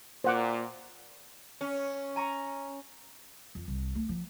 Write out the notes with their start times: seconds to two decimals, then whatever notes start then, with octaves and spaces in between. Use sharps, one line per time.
0.24 A#2 C5 F#5 D6
1.61 C#4
2.16 G#5 A#5 C#6
3.55 F2
3.68 C2
3.95 A3
4.09 F3